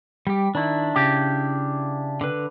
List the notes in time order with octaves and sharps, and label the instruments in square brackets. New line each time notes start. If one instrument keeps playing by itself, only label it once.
[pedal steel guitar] G3 G4
[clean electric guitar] D#3 [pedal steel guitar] D4 E4
[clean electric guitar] C#3 G4
[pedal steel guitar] D3 B4